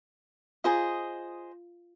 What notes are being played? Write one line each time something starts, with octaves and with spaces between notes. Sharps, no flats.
F4 G#4 C5 D#5 F5